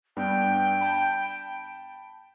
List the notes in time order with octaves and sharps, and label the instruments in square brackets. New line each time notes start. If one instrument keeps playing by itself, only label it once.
[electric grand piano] G2 B3 D4 [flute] G5
[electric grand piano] A5 B5